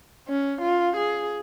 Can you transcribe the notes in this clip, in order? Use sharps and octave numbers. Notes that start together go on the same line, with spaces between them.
C#4
F4
G#4